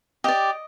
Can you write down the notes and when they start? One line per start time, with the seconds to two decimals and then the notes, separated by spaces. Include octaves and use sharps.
0.24 G4 D5 D#5